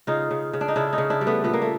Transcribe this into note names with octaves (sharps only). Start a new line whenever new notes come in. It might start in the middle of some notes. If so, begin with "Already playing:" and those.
C#3 D#4 F4
C#3
C#3
D4
D#4
C#3 D4 E4
C#4 D#4
C#3
D4 E4
G3
A3 B3
A#2 B3
A#3
A3